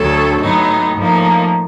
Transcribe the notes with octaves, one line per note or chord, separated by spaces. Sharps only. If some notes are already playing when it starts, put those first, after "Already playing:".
Already playing: D2 D3 F#3 A4
A2 F#3 B3 D#4
A2 F3 A#3 D#4